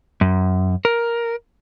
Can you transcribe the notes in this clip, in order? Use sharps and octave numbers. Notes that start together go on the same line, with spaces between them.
F#2
A#4